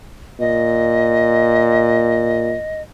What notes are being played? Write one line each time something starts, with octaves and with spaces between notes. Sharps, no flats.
A#2 D#5